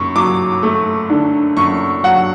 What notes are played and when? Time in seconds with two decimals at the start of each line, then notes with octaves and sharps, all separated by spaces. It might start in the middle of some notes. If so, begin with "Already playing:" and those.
Already playing: F#2 C#6
0.16 F#3 D6
0.63 A3
1.10 D3
1.57 F#2 C#6
2.04 F#3 F#5